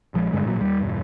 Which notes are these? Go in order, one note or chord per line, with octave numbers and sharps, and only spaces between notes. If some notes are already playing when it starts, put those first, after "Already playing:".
A#1 F3 G#3
G2 D3 G#3
A1 A#2 F#3
D#2 G3
E1 G2